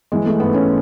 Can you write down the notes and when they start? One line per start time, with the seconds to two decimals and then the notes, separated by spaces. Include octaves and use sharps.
0.12 E3 G#3
0.26 A3
0.40 G#2 B3
0.54 C#4